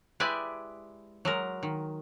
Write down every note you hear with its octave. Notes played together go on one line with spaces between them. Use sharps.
G#3 E4 G4 B4 D5 G#5
F#3 G#3 A#4
D#3